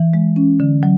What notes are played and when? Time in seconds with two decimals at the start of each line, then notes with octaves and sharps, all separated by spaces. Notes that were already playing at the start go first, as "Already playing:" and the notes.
Already playing: E3
0.14 G#3
0.36 C#4
0.60 D3
0.83 F#3